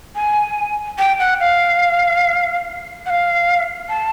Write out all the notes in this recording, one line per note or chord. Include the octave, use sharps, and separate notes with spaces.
G#5
G5
F#5
F5
F#5
F5
A5